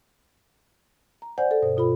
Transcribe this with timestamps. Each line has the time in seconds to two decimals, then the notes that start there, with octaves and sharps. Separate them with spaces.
1.22 A#5
1.38 C5 D5 F#5 G#5 G6
1.51 A4
1.62 G2 B2 C5
1.77 B2 F4 A4 B5